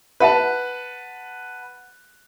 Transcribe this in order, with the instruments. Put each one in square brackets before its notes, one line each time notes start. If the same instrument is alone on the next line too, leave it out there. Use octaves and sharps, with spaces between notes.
[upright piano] B4 F#5 A5